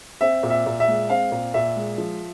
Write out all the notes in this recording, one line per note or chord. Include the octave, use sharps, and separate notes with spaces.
C4 E5
A#2
E5
A#2
E5
G#3
C4 F5
A#2
A#2 E5
G#3
F3